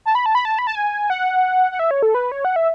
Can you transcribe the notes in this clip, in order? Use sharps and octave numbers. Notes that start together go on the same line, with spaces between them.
A5
B5
A5
B5
A5
B5
A5
G#5
F#5
F#5
E5
C#5
A4
B4
C#5
F#5
E5